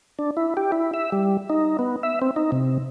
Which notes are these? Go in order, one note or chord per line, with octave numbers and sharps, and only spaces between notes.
D4
E4
G4
E4
E5
G3
D#4
B3
E5
C4
D#4
C3